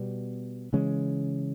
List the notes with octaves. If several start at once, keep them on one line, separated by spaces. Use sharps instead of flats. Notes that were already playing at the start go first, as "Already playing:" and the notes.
Already playing: B2 G3 B3
C#3 E3 G#3 C#4